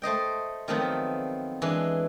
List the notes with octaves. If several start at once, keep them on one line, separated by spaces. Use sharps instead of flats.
A3 C5 D#5 G5
D#3 F3 F#3 A3 B3 C4
E3 G#3 D4